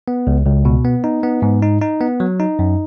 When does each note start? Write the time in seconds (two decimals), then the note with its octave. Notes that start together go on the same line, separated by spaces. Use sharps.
0.08 B3
0.27 C#2
0.46 C#2
0.65 B2
0.85 B3
1.04 D#4
1.23 B3
1.42 G#2
1.62 D#4
1.82 D#4
2.01 B3
2.20 F#3
2.40 D#4
2.59 F#2